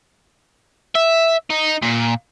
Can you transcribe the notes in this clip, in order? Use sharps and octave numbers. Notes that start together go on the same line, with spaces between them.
E5
D#4
A#2